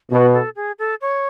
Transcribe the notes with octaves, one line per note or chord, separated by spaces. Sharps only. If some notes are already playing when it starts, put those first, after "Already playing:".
B2 F#4
A4
G#4
A4
C#5